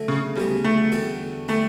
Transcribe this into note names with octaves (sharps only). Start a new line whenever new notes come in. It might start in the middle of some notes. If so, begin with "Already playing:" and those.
Already playing: D3 F#3 A3
C#3
D2 C#3 F#3 G3 B3
A3
E2 D3 G3 D4 F#4
D3 G3 A3 D4